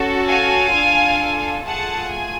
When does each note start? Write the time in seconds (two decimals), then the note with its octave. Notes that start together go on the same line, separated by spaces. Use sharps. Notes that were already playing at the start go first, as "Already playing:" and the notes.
Already playing: C#4 F#4 A4
0.28 F5 G#5
0.73 D4 F4 A4
1.63 A3 F4 G#4 F#5 A5
2.09 G#5